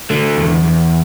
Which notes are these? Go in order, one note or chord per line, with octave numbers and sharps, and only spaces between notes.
D3 A3
E2
E2